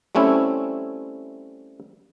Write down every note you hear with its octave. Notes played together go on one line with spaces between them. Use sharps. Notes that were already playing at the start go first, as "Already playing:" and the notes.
G3 A3 C4 C#4 E4